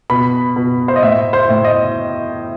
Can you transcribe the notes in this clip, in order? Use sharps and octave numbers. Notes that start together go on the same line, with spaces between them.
B2 B5
B2
C5
D#5
A2 E5
C5
A2
D#5